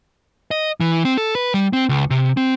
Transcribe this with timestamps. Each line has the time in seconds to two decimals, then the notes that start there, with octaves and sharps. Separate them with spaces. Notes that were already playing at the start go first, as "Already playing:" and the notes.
0.51 D#5
0.80 E3
1.05 C4
1.17 A4
1.35 B4
1.54 G3
1.73 C4
1.89 C#2
2.10 C3
2.37 C4